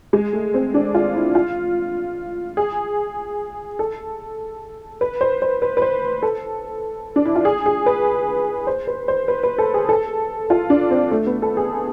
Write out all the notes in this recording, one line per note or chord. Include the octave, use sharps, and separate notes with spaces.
G#3
A3
C4
D4
F4
E4
F4
G#4
A4
B4
C5
C5
B4
B4
C5
A4
D4
E4
F4
G#4
G#4
B4
C5
B4
C5
B4
B4
A4
G#4
A4
F4
D4
C4
A3
B3
A4
G#4